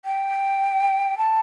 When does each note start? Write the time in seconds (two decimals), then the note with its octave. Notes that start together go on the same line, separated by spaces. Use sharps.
0.05 G5
1.18 A5